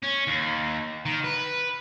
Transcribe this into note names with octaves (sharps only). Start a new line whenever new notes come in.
C#4
D#2
D#3
B4